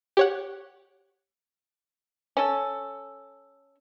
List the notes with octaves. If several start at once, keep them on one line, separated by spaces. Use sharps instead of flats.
G4 C#5 F#5
C#4 A4